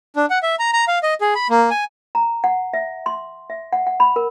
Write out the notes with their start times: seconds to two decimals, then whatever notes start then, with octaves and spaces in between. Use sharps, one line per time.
0.16 D4
0.30 F#5
0.43 E5
0.59 A#5
0.73 A#5
0.88 F5
1.03 D#5
1.21 G#4
1.35 B5
1.50 A#3
1.70 G#5
2.15 A#5
2.44 F#5
2.74 E5
3.06 C6
3.50 E5
3.72 F#5
3.87 F#5
4.00 B5
4.16 A#4